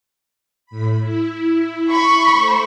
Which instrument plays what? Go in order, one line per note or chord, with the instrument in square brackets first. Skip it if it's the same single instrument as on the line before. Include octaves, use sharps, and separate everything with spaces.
[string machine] A2 B5
E4
[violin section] B5 C#6
[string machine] A3 C5